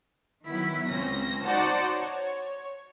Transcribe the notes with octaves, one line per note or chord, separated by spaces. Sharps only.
D#3 F#3 B3 E4 B6
C#2 C4 C#4 A#6
D#4 F#4 C5 D5 F#5 A5
C#5